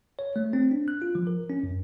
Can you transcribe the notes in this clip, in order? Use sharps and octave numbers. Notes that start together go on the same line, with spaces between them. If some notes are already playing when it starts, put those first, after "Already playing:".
C#5
A3
C4
D4
F#6
F4
F3
A#4
C#4
F#2